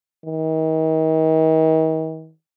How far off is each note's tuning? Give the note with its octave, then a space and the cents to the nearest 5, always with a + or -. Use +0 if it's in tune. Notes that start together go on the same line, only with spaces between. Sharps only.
D#3 +40